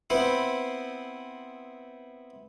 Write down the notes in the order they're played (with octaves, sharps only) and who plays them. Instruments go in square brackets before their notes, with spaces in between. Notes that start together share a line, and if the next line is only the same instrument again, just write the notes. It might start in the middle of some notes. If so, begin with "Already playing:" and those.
[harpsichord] B3 C4 E4 B4 C5